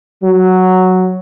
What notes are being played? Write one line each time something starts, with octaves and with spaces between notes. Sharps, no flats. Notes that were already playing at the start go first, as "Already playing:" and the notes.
F#3